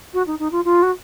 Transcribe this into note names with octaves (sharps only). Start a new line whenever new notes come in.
F#4
D#4
D#4
F4
F4
F#4